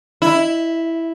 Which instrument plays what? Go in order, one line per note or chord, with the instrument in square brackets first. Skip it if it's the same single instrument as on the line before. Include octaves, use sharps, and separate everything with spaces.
[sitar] E4